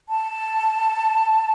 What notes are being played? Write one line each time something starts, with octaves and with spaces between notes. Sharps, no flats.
A5